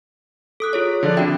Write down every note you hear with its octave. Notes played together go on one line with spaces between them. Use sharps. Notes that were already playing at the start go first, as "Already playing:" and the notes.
A4 D#6 F#6
F4 G#4 C#5
D3 F3 D5
C4 F#4 E5 G5